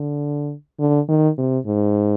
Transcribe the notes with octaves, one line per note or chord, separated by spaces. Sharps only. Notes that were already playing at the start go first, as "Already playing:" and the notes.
Already playing: D3
D3
D#3
C3
G#2